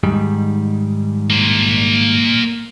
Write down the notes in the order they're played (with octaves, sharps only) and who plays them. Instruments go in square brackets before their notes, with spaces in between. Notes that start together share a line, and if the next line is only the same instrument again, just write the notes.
[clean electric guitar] G#2 D#3 G3
[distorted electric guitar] A#3 C5